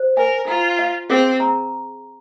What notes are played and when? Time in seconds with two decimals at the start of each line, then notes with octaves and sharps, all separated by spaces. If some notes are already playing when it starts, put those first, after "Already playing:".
Already playing: C5
0.17 A#4 G#5
0.48 F4 A#5
0.79 F5
1.10 C4 G#4
1.40 A#5